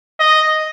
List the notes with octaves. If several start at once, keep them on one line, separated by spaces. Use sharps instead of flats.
D#5